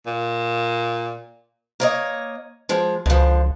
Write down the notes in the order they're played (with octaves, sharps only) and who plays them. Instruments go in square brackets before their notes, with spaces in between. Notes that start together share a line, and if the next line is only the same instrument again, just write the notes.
[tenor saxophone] A#2
[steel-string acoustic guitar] A#3 C#5 D#5
F3 G#3
[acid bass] C#2 [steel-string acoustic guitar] D3 F3